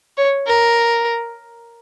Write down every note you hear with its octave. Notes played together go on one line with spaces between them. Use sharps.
C#5
A#4